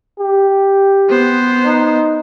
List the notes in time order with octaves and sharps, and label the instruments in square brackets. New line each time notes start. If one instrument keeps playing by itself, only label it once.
[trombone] G4
[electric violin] B3 C5
[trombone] D#4